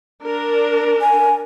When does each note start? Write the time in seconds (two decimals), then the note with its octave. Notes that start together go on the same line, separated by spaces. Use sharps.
0.24 D4 A#4
1.01 G#5